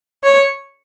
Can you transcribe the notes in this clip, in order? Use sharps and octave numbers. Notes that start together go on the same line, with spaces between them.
C#5